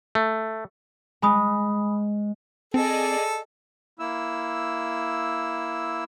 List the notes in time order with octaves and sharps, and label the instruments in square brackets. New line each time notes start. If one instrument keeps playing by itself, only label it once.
[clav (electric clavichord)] A3
[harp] G#3 [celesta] G#5 B5 D#6
[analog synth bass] C4 [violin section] G#4 D5 D#5 [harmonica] A4
[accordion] A#3 E4 E6